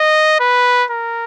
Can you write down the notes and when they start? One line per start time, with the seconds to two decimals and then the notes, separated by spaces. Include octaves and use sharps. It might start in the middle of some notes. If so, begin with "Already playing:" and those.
Already playing: D#5
0.40 B4
0.90 A#4